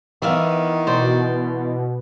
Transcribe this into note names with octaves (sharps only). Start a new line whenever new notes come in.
D#3 E3 B3 D5 E5 F5
B2 C5 D5